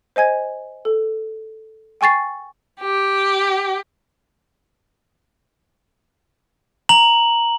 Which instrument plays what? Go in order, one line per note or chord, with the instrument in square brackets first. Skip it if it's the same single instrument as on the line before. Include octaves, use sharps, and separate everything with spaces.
[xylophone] C5 D#5 G#5 G#6
A4
G5 G#5 C#6 A6 C7
[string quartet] G4
[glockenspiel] A#5 F#7